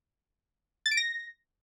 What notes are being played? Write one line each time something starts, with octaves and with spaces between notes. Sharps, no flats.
A6
D7
A#6